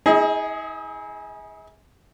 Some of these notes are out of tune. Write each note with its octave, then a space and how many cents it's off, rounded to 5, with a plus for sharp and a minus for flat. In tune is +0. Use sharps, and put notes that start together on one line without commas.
E4 -45 G#4 +0 D#5 +15